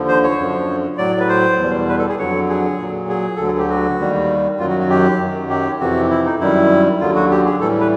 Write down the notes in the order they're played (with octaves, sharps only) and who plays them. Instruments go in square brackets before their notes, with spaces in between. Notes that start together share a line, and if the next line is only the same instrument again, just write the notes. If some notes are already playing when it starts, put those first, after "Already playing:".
Already playing: [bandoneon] D#2 D3 F3
C5
C#5
F#2 D3 F3
A2 F#3 D5
B4
C5
E2 B2 G3
B4
A4
G#4
F2 D3 F#3 C#5
G#4
A#2 F#3
G#4
D2 D3 F#3 A4
G#4
G4
F#4
D#2 D#3 G3
F#2 D#3 F#3 F4
F#4
F#4
G4
F#2 D#3 F#3
G4
F2 C3 E3 F#4
E4
D#4
F#2 D#3 G3 E4
D#2 D3 F#3 F4
F#4
G4
G#4
A2 E3 G3 A4
B4